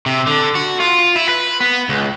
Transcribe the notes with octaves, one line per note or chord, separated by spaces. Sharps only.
C3
D3
F#4
F4
E4
B4
B3
C#2